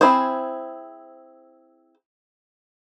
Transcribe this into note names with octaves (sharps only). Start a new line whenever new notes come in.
C4 E4 G#4 C5